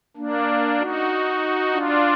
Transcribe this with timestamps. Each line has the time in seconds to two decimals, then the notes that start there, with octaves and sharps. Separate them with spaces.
0.17 A#3 D4
0.79 D#4 F#4
1.73 D4 F4